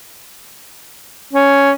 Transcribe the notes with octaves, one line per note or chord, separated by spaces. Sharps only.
C#4